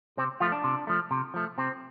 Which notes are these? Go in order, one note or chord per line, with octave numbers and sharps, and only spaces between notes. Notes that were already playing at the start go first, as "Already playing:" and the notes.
C3 C4
F3 A3 F4
D4
C3
F3 A3
C3
F3 A3
C3 C4